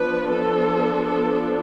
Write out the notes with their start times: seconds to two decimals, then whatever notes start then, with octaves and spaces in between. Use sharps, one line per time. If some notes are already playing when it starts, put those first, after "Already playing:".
Already playing: F3 B3 D4 B4
0.30 A4
1.05 A4